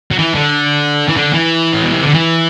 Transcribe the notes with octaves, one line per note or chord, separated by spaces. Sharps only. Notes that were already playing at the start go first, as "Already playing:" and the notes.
F#3
E3
D3
E3
D3
E3
A2
B2
C3
D3
E3